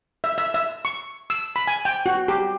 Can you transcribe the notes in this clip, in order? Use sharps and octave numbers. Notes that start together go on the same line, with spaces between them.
E5
E5
E5
C#6
E6
B5
G#5
G5
F#4
G4